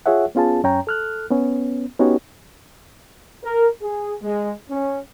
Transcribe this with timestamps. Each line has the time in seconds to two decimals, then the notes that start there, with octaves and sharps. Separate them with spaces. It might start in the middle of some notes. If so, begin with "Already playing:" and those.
0.06 F4 G#4 C#5 E5 F#5
0.35 B3 C#4 F4 G#4 A5
0.64 F#2 C#4 C#5 G5 A#5
0.87 A4 F6 F#6
1.31 B3 C#4
1.99 B3 C#4 D#4 F#4 G4 C#5
3.44 A#4
3.81 G#4
4.22 G#3
4.70 C#4